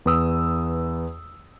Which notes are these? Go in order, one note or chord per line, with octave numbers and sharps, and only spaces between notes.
E2 B4 D#6 E6